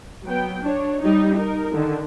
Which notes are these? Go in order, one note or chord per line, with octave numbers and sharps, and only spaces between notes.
F#3 B3 G5
D4 C#5
G3 D#4
D#4 A#4
D3 D#3